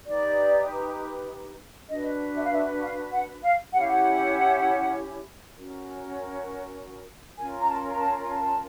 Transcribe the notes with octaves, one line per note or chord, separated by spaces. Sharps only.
D#4 G4 B4 D5
D4 F#4 B4 D#5
E5
F5
E5
F5
F#5
F5
C#4 E4 G4 F#5
F5
F#5
C#4 F#4 A#4
C#4 F4 A#4 G#5
A#5
A5
A#5
A5
A5